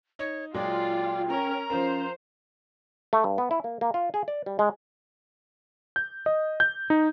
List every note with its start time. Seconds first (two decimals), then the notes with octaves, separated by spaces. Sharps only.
0.19 D#4 C#5
0.54 A#2 F#3 G#3 F4 D5 G5
1.29 C#4 A#4 A#5
1.70 F3 C#4 F4 A#4 C5
3.13 A3
3.24 G2
3.38 B3
3.51 E4
3.64 A#3
3.81 A#3
3.94 F4
4.14 G#4
4.28 D5
4.46 G3
4.59 G#3
5.96 G6
6.26 D#5
6.60 G6
6.90 D#4